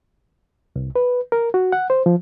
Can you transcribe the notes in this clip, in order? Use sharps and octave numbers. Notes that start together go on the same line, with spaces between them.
C2
B4
A#4
F#4
F#5
C5
F3